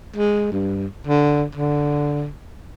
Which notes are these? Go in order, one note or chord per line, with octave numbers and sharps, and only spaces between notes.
G#3
G2
D3
D3